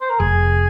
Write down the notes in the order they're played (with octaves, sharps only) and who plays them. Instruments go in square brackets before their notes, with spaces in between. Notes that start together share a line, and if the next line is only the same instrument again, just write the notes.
[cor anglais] C5
A#4
[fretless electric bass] F1 [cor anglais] G#4